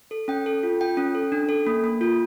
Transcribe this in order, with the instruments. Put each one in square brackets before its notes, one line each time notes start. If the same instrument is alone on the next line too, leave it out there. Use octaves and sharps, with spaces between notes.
[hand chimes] A4
C#4 G5
A4
F4
F4 G5
C#4
A4
D4
A4
A#3
A#3
F4